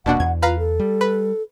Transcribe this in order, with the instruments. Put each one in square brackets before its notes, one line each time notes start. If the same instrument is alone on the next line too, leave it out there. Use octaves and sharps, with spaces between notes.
[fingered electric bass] D#1 A#3 [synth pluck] B2 D4 F#4 [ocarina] F#5
[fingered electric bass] E2 [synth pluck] G#6
[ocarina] F4 [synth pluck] B4 F5 A#5
[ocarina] A4
[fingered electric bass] G3
[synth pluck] B4